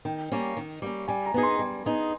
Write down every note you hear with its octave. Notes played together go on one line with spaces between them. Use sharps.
D#3 G5
G3 A#3 C#4
D#3
G3 A#3 C#4
G3 G#5
A#5
B3 D#4 G#4
C6
G3
B3 D#4 G#4